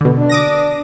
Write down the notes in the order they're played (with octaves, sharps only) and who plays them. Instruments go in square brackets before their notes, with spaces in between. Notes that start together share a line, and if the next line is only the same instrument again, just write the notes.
[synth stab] B2 D3
[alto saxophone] D4
[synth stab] D6 D#6 A#6